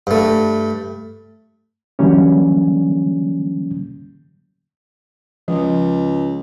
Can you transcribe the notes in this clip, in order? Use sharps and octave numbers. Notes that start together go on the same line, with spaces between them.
G2 A3
D3 E3 F#3 G3 A#3 C#4
C#2 F3